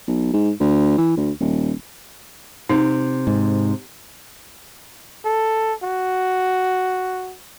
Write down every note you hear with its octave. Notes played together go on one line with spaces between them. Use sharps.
B1
G#2
D2
E3
D2
D#1
C3 D#4
G#2
A4
F#4